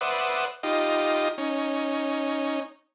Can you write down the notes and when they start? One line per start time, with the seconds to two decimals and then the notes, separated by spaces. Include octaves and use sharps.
0.01 B4 C5 D5 E5 F#5 D#6
0.63 D#4 F4 G4 D#5
1.38 C#4 D#4